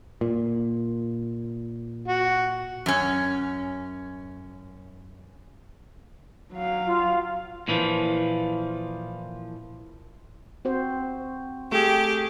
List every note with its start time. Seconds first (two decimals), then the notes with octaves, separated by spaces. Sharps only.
0.21 A#2
2.08 F#4
2.86 F#2 C#4
6.53 F#3 F5
6.88 F4
7.68 A#2 E3 F3
10.65 C4 F#4 C5
11.72 A3 G4 G#4